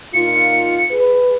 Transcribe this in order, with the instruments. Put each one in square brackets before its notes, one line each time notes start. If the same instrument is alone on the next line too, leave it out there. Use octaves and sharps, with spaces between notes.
[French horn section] A#2 D#4 F4 [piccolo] C#7
[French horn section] G#4 B4